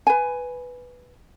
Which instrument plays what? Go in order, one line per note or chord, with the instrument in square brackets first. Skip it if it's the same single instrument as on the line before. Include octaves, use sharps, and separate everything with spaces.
[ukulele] B4 G#5